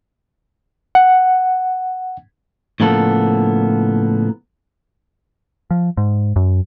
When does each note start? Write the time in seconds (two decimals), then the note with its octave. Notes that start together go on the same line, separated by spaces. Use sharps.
0.95 F#5
2.80 A2 C#3 F3 A#3 B3 A4
5.71 F3
5.97 G#2
6.36 F#2